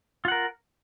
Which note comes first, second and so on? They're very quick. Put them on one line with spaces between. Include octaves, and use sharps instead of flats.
F4 F#5 A#4